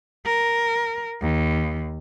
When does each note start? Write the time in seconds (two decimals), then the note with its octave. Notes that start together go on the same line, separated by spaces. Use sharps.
0.25 A#4
1.22 D#2